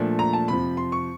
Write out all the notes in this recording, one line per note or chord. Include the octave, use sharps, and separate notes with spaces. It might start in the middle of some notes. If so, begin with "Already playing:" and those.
Already playing: A#2 F3 A3 D4
A#5
A5
F2 C3 F3 B5
C6
C#6